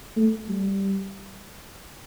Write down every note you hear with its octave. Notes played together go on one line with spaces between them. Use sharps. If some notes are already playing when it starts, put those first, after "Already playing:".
A3
G3